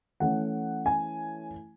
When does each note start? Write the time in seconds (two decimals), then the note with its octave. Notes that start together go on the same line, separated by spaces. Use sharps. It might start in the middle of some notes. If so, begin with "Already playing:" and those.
0.20 E3 A3 C#4 F#5
0.86 G#5